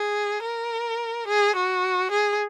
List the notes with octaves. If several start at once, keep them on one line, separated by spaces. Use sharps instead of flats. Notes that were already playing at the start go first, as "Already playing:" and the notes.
Already playing: G#4
A#4
G#4
F#4
G#4